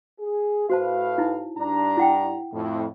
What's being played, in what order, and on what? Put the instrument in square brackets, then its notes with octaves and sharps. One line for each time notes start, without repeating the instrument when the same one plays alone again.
[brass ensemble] G#4
[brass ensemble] A2 B4 F5 [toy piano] F#4 C5 A5
[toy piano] D#4 E4
[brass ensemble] G2 D4 A#5
[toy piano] E4 F#5 G5
[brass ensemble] F2 A2